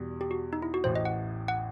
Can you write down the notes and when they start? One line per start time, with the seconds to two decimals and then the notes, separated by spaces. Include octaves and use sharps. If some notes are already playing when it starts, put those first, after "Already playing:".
Already playing: E2 B2 G3
0.21 G4
0.31 F#4
0.53 D#4
0.62 E4
0.74 F#4
0.84 A1 A2 E3 C5
0.96 D#5
1.05 F#5
1.48 F#5